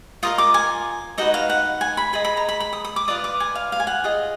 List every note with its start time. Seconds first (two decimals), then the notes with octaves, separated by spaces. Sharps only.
0.23 F4 A#4 D#5 D#6
0.38 D6
0.54 G#5
1.18 D#4 F#4 B4 D#5
1.34 F5
1.50 F#5
1.81 G#5
1.97 B5
2.13 G#4 D#5 B5
2.25 B5
2.37 A#5
2.49 B5
2.60 B5
2.73 D#6
2.84 D#6
2.96 D6
3.08 F4 B4 D5 D#6
3.24 D6
3.40 G#5
3.55 F5
3.72 F5
3.80 G#5
3.87 F#5
4.04 F4 G#4 D#5